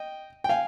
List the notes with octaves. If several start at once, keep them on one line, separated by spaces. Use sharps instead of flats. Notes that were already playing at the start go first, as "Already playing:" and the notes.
Already playing: D#5 G5
G5
F5 G#5